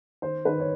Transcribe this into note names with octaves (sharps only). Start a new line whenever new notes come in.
D#3 C5
D#3 B4
C#5